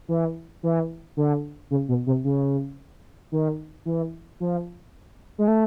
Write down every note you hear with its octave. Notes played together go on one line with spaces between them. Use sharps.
E3
E3
D3
C#3
B2
C3
C#3
D#3
E3
F3
G#3
A3